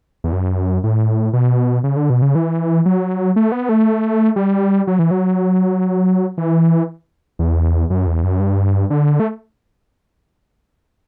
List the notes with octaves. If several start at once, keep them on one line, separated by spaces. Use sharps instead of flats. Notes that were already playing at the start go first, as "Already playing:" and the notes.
E2
F#2
A2
B2
C#3
D3
B2
C#3
E3
F#3
A3
B3
A3
G3
F#3
E3
F#3
E3
E2
F#2
E2
F#2
G2
D3
A3